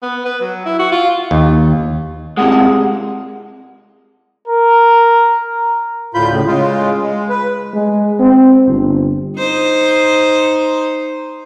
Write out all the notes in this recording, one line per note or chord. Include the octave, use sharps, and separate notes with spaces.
B3
B4
F#3
E4
F#4
F4
D#2
C3 G#3 F#5
A#4
D2 A2 F4 B5 G6
A2 C#3
C#3 G#3 F4
G#3
B4
G#3
C4
G1
D#4 C5